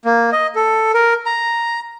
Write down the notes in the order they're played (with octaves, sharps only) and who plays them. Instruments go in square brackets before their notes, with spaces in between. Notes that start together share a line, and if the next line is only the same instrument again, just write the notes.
[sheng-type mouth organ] A#3
D#5
A4
A#4
A#5